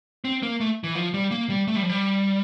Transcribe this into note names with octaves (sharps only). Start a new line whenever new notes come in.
C4
A#3
A3
E3
F3
G3
A#3
G3
A3
G3
F3
G3